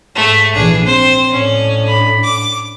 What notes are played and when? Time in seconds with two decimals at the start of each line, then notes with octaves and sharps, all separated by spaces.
0.15 G#2 A3 E5
0.54 A#1 E3 D4 G#4
0.86 C4 C5
1.31 A2 C#4 D4
1.88 B5
2.23 D6